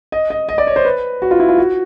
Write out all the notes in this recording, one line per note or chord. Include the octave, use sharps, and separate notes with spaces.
D#5
D#5
D#5
D5
C#5
C5
B4
F#4
F4
E4
F4
F#4